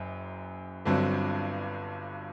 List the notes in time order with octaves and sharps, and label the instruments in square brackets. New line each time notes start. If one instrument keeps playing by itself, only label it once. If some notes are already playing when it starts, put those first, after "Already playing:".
Already playing: [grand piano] F#1 F#2
G1 G2 D3 F#3 C4